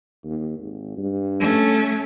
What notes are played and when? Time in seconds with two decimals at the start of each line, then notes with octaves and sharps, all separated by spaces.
0.24 D#2
0.59 G#1
0.97 G2
1.39 A3 C#4